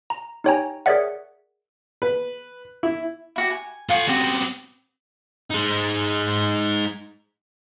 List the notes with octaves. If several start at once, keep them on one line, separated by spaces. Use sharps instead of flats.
A#5
D#4 G4 C#5 G5 G#5 A#5
G#4 A#4 C#5 D5 E5 F#5
B4
E4
E4 F#4 G4
G#5
F4 A4 F#5 G#5 C#6
B3 C4 F#4 G4 D#6
G#3 D#4